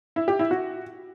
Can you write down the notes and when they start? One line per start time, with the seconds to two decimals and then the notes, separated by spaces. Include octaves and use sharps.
0.16 E4
0.28 G4
0.39 E4
0.51 F#4